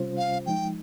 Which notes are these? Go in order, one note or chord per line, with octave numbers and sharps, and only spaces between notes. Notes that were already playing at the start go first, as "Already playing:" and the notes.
Already playing: C3 G3 C#4 F4 C5
F5
F3 G#3 D#4 G5